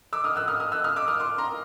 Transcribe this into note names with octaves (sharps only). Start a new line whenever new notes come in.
D6 E6
D#6 F6
E6 F#6
D#6 F6
D#6 F6
E6 F#6
D#6 F6
D6 E6
D#6 F6
C6 D6
A#5 C6